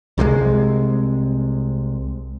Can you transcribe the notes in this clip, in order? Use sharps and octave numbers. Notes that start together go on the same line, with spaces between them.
C2 C3 D#3 G#3